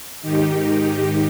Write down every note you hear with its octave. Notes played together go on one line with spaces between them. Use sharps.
G#2 D#3 D#4 G4